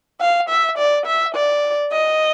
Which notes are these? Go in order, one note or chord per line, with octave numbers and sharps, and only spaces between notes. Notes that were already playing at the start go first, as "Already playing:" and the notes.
F5
E5
D5
E5
D5
D#5